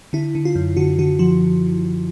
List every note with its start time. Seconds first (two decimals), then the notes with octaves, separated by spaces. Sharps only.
0.13 D3 E4
0.35 D3
0.45 F4
0.55 F#2
0.77 D3 F#4
0.99 D3 F#4
1.19 F3 F#4